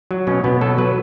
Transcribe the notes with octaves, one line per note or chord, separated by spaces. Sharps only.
F#3
B2 C#4
B2 B3
F#3 A4
F#3 B4